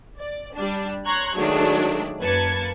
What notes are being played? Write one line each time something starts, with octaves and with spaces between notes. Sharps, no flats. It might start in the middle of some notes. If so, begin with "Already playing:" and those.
D5
G3 D4
C#5 A#5 C6 C#6 F#6 G#6
D#3 F#3 G#3 A3 D4
F#2 A#3 B4 A5 G#6 C#7